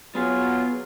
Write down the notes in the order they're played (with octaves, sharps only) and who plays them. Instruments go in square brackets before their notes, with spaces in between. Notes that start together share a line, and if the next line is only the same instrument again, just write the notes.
[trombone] F#3 [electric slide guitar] B3 G#4 [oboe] F4